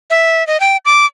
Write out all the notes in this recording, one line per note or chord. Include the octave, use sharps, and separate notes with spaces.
E5
D#5
G5
D6